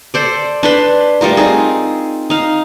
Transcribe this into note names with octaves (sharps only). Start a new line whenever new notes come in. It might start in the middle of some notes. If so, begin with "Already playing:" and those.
A4 C5 D5
D4 B4 C6
G3 A3 F4 A#4
C4 D#4 G#4
D#4 F5